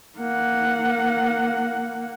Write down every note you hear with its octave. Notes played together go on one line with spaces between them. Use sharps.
A#3 F#5